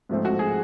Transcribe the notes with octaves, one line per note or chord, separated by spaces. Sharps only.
G#2 F3 A3 C4
F#4
G#4